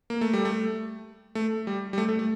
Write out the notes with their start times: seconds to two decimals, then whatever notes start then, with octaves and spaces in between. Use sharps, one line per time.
0.10 A#3
0.21 A3
0.33 G3
0.45 A3
1.35 A3
1.67 G3
1.93 G3
1.98 A3
2.09 A3
2.19 A3